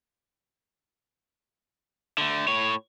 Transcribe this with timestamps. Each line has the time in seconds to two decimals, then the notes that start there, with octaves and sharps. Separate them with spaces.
2.18 D3 A3
2.48 A2 C#5